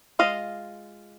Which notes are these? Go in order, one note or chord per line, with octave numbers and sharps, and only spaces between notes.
G#3 C#4 F4 D#5 F5